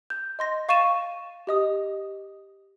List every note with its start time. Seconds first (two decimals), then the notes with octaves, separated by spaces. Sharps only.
0.10 G6
0.39 D#5 C6 A#6
0.69 F5 C#6 A6 D#7 E7
1.47 G4 D#5 D#6